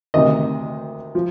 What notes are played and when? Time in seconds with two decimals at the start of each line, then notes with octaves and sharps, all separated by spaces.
0.14 D2 C3 D#3 D#5
1.15 F3